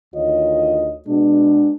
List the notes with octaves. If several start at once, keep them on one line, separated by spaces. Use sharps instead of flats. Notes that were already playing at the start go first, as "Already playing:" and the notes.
D2 D#3 F4 C#5 D#5
B2 G#3 D4